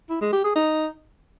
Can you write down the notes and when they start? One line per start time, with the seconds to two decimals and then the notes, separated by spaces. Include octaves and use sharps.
0.10 E4
0.21 G#3
0.33 G4
0.44 G#4
0.55 D#4